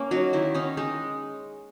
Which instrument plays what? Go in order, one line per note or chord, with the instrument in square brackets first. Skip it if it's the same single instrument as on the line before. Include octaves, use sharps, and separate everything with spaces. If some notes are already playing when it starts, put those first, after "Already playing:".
Already playing: [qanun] A#3 C#4
F#3 D#4
D#3 E4
C#4 D#4
G#3 D#4